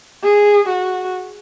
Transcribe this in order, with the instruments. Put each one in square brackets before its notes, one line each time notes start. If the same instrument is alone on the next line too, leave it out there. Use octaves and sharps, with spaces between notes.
[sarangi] G#4
F#4